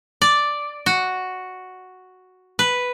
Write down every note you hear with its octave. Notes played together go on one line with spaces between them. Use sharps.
D5
F#4
B4